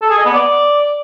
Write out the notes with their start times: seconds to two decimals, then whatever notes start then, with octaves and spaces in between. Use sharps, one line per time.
0.02 A4
0.10 G#4
0.17 D#5
0.25 B3
0.33 D5